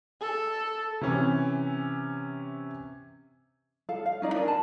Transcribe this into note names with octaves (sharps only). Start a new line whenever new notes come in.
A4
C3 E3 C#4
A4 F5
F5
C#4 D#4 D5
D4 A#4 G#5
A5 B5